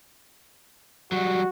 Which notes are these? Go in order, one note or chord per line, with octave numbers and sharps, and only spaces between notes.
F#3 G3 F#4